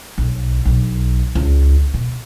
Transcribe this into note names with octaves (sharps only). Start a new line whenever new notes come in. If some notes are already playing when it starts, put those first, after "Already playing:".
B1
B1
C#2
B2